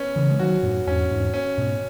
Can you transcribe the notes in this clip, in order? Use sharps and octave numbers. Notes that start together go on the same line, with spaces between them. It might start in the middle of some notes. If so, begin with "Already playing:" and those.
Already playing: B3 C#4
C#3 E3
G#3
D#3 F#3 F#4
F#2 A2
E2 G#2 C#4
E2 G#2
C#4
G#2 B2